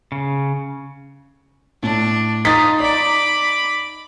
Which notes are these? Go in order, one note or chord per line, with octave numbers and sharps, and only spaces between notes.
C#3
A2 D4
D#4 F4 D#6 A6 B6
D5 B5 D6